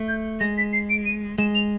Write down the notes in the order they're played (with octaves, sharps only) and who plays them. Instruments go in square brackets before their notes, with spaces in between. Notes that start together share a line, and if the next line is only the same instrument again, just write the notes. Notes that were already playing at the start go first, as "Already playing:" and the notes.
Already playing: [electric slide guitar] A3
[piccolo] G6
[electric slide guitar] G#3 [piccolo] A#6
[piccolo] B6
C7
D7
D#7
[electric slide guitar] G#3 [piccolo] E7
[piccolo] F7